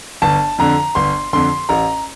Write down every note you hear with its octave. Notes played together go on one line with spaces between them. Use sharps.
G1 A5
F2 D3 A#5
G1 C6
F2 D3 C6
A1 A#5